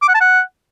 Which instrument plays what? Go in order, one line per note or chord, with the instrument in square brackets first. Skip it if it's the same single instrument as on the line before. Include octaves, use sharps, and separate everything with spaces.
[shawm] D6
F#5
A5
F#5